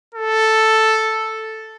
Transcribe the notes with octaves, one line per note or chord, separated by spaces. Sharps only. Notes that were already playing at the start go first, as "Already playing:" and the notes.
A4